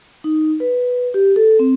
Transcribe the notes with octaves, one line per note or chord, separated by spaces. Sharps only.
D#4
B4
G4
A4
C4